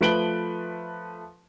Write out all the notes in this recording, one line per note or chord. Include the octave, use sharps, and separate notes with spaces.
F3 A3 B4 D7 F#7 G7